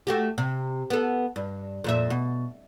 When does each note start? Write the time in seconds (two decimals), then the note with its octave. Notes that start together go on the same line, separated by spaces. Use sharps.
0.07 A3 F#4 G4
0.38 C3
0.90 B3 A4
1.36 G2
1.84 F2 A#2 E5
2.10 B2